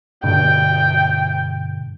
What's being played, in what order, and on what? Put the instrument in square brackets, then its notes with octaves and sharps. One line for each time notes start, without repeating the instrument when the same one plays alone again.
[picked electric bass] G2 B2 D3 [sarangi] G5